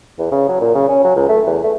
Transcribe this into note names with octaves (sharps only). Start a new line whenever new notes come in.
E2
C#3
F#3
A#2
C#3
C#4
F#3
C#2
A3
E2
A3